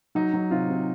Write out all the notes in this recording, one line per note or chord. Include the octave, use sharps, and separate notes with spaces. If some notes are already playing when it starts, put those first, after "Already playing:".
F#3 D#4
F#3
C3 F4
C3